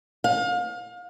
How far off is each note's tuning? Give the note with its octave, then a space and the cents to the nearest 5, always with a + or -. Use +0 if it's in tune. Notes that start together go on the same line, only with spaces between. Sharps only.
F5 +30